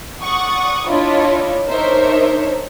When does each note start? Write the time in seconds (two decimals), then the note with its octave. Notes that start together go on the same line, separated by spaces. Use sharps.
0.22 D5 F#5 C#6 D#6
0.89 D4 E4 F4 C#5 D#5
1.68 D4 D#4 A#4 C5 C#5 E5